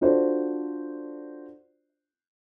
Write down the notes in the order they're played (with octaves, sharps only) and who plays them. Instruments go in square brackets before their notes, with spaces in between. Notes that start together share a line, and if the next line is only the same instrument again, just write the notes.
[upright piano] D4 F4 F#4 A4 C5 D5